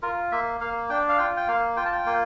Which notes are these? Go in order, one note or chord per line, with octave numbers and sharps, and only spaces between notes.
F4 A#4
A#3 E5
A#3 F5
D4 G5
F5
F4 G5
G5
A#3 F5
F4 G5
A5
G5
A#3